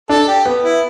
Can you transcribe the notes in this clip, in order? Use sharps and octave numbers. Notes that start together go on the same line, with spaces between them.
D4 A4
G4
B3
E4